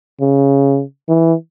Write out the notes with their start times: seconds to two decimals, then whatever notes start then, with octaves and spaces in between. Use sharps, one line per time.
0.21 C#3
1.09 E3